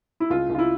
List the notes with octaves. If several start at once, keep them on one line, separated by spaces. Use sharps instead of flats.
E4
C#2 F4
C#2
F4
E4